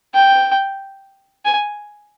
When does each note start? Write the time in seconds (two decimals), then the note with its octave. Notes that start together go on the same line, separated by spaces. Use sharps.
0.14 G5
1.45 G#5